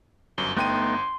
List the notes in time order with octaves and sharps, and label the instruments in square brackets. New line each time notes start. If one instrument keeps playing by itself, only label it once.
[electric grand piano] G1 F#2 [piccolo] G7
[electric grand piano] G1 G5 D#7 [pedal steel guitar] A3 B3 D#4 [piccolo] C6